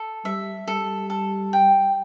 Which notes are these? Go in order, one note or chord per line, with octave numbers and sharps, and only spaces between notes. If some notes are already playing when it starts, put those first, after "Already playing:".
Already playing: A4
G3 E5
G3 A4
A4
G5